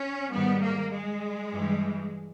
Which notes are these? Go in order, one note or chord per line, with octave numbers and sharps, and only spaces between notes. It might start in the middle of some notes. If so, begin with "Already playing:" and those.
Already playing: C#4
G#2 D#3 G3 B3
A#3
G#3
G2 E3 G3